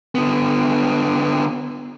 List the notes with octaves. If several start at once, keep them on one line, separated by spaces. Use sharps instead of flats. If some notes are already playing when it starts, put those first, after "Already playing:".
D3 B3